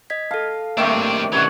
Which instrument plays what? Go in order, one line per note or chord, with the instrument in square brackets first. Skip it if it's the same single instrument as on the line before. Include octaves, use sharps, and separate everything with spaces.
[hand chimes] D#5 G#6 B6
[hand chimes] A4 A5 [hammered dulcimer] F5
[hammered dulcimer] C3 D#3 A3 [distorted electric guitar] G3 D4 [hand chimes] A#3
[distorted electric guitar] E3 D4 [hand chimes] C#4 G4 [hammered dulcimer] C#5 F#5